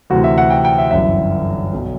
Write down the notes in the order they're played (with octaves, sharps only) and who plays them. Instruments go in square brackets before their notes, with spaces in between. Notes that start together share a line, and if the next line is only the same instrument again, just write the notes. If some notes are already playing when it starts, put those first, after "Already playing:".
[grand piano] D2 C3 E3 F#4
E5
F#5
G5
G5
E5
G1 F#2 E3 E5
B1 B2